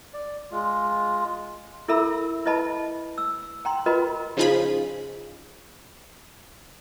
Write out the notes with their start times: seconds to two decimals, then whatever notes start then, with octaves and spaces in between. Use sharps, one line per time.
0.14 D5
0.51 G#3 F4
1.88 E4 A4 A#4 E5 B5 E6
2.46 E4 B4 D#5 A5 B5
3.18 E6
3.65 G5 A#5 C6
3.86 F4 F#4 A#4 B4 D#5 B5
4.37 C#3 F3 D#4 F4 G#4 B5